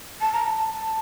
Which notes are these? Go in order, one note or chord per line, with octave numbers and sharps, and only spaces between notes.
A5
A#5
A5